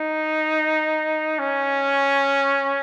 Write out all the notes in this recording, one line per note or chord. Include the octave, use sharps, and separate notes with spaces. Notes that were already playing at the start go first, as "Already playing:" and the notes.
Already playing: D#4
C#4